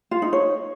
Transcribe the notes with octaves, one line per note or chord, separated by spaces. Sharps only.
F4
D#4
C#5